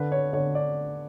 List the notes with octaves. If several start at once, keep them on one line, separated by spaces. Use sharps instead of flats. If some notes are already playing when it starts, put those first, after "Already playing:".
Already playing: D3 B4
C#5
D3 C#5
D5